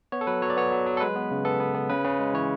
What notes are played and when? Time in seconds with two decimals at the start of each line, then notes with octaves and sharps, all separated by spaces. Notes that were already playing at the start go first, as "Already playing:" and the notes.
0.12 B3 C#5
0.21 A4
0.27 F#3 B4
0.42 F#3 C#5
0.50 D5
0.57 B3 C#5
0.72 F#3
0.86 F#3
0.97 A4
1.01 G#3 B4
1.16 B3
1.31 C#3
1.45 B3 A4
1.60 B3
1.75 B3
1.90 C#3 B4
2.05 C#3
2.20 G#3
2.34 E3 C#5